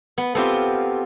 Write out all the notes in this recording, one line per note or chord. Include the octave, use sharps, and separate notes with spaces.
B3
B3 C4 F4 G4 A4